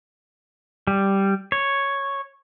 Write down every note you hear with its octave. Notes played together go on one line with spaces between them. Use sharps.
G3
C#5